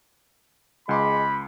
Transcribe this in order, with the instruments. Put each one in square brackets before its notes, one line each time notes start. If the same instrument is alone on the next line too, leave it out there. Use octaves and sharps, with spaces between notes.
[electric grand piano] C#2 C6 D6 [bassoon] G#3 [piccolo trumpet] B5